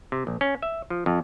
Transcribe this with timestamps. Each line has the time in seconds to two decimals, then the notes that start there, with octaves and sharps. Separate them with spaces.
0.12 C3
0.27 A#1
0.41 C#4
0.62 E5
0.90 F3
1.06 F2